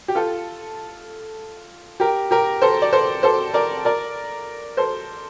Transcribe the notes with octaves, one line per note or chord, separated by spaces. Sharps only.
G4
F4 A4
G4 A#4
G4 A#4
A4 C5
D5
A4 C5
A4 C5
A#4 D5
A#4 D5
A4 C5